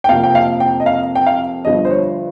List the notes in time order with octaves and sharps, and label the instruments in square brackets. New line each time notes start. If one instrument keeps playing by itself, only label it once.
[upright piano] G5
F2 C3 F3 A#3 F5
G5
F5
G5
D#5
F5
G5
F5
G1 G2 F3 D#5
C5
C#5